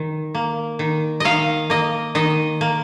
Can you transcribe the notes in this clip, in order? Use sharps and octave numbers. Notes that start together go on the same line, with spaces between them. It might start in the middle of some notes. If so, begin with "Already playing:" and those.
Already playing: D#3
A#3
D#3
D#3 D#5 F5
A#3 D#5
D#3 D#5
A#3